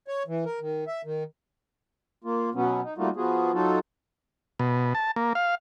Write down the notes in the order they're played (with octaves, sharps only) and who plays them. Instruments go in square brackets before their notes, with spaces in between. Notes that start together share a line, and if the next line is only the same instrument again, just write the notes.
[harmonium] C#5
E3
A#4
D#3
E5
D#3
A#3 F4
B2 F#3 B3 C#4
D#4
G3 A3 A#3 D#4 F4 F#4
F3 B3 F4 F#4 G#4
F#3 D#4 F4 F#4 A4
[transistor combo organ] B2
A5
A#3
F5